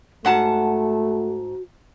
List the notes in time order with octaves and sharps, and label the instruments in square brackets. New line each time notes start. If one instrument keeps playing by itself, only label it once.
[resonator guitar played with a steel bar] G#2 F#5 A5 [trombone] A3 [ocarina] F#4